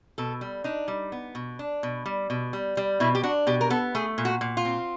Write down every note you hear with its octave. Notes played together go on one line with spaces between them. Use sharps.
B2 A4
G3
D4 D#4
G3
B3
B2
D4
B2
G3
B2
G3
G3
B2 E4
G4
D4 F#4
B2 G4
A#4
B3 A4
A3 G#4
A#2
F#4
A#2
F4
C4